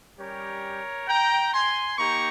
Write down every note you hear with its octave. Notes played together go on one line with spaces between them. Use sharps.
G3 C#4 G4 A#4 C#5
G5 A#5
G#5 C6
A#3 D#4 G4 A#5 C#6